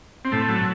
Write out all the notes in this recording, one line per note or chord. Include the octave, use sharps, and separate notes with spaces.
C4
A2 A3
F#3